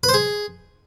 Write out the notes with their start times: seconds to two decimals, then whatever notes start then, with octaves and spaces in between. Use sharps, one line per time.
0.03 B4
0.09 C5
0.14 G#4